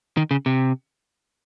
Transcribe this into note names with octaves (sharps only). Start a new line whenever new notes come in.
D#3
C#3
C3